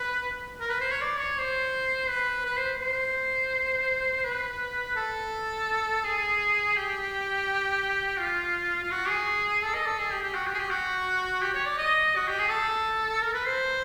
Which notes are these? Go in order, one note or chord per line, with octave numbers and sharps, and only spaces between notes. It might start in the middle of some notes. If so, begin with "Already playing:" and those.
Already playing: B4
A#4
B4
C5
C#5
D5
C#5
C5
B4
B4
C5
C5
B4
A4
G#4
G4
F4
F4
F#4
G#4
A4
D#5
A4
G#4
G4
G4
F#4
G4
G#4
G4
F#4
G4
C#5
D5
D#5
F#4
G4
G#4
A4
A#4
B4
C5